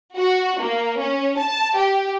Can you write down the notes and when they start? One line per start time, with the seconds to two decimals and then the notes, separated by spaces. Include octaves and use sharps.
0.16 F#4
0.60 A#3
1.00 C#4
1.38 A5
1.76 G4